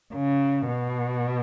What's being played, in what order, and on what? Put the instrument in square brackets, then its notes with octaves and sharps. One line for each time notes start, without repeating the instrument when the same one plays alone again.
[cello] C#3
B2